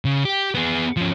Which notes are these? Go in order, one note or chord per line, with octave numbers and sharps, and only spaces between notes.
C#3
G4
B3 G#4
F3 C#4